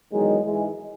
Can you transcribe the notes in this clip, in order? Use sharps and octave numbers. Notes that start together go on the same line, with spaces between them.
E2 D#3 F#3 G#3
G#2 E3 G#3